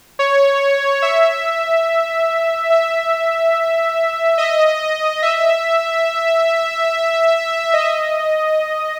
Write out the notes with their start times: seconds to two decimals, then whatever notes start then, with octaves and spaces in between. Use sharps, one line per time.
0.19 C#5
1.02 E5
2.70 E5
4.38 D#5
5.22 E5
7.73 D#5